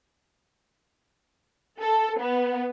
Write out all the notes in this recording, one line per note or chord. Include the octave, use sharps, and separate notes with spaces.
A4
B3